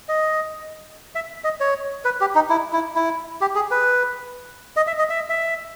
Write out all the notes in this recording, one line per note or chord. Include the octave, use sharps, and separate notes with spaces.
D#5
E5
D#5
C#5
B4
G4
D#4
E4
E4
E4
G4
G#4
B4
D#5
E5
D#5
E5
E5